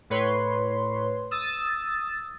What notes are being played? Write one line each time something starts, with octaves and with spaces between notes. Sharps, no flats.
A2 B4 C#5 C6
D#6 E6 A6